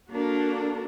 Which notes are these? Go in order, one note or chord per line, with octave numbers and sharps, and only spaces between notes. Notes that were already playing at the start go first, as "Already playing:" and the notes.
A#3 D4 F#4 A4 A#4